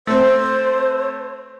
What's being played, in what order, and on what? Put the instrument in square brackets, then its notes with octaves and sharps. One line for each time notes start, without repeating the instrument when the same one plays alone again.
[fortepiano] A3 C4 [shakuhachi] C5